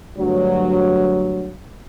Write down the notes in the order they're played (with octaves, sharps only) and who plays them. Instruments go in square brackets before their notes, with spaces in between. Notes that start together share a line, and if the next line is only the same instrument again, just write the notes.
[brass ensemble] D2 G2 F#3